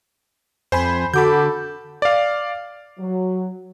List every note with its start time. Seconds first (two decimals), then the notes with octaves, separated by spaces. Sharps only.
0.72 F2 C5 G#5 B5
1.14 D3 F#4 A4 B5 D6 G6
2.02 D5 F5
2.99 F#3